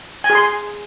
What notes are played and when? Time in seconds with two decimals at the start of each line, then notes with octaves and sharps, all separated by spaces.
0.24 G#5
0.30 G#4
0.35 C6